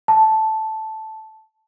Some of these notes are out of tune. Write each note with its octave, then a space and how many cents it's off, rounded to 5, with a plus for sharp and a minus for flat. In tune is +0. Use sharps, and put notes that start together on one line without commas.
A5 -5